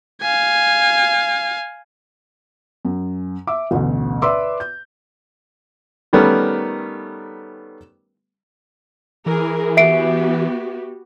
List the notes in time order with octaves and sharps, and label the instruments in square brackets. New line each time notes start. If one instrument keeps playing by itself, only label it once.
[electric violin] F5 G#5
[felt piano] F#2
E5 D6 E6
A1 D2 B2
B4 D5 E5 C6 D6 E6
G6
[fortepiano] D#3 G3 A3 B3 C#4 A#4
[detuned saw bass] E3 [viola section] G#4 A#4
[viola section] B3 F#4 G4 [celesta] E5 C7 D7